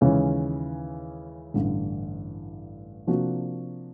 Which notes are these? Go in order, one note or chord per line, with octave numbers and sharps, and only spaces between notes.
D#2 C#3 E3 G#3 C#4
A1 G2 D3
C3 F3 A#3 D4 F#4